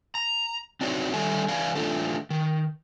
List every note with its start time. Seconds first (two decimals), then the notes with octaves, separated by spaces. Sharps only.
0.15 A#5
0.81 C4 D4 D#4 F#4 A4 C#5
1.14 D3 D#3 G3 A4 E5 G#5
1.48 E3 D5 F5 G#5
1.75 E3 A3 D4 F4 A4
2.30 D#3